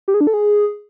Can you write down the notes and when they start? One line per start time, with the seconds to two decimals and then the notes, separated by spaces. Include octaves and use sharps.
0.08 G4
0.14 G#4
0.21 D4
0.27 A4
0.34 G#4